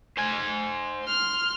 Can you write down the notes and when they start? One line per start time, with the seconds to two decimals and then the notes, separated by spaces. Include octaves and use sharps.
0.18 C5 G#5
1.03 C6 F6